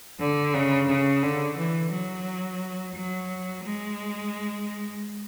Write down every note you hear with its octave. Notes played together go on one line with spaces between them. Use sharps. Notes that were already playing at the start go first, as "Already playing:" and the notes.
D3
C#3
C#3
D3
E3
F#3
F#3
G#3